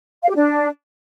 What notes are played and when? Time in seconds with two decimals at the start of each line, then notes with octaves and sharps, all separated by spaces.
0.23 F5
0.29 G4
0.35 D4